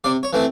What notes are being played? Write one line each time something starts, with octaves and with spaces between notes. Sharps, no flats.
C3 D5
C#5
E3 A3 C4